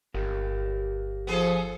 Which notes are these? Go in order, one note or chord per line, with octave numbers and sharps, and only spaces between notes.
G1 G4 A#4 F5
F3 B3 G#4 A4